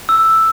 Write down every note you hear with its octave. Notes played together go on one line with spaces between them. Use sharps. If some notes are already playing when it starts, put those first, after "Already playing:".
E6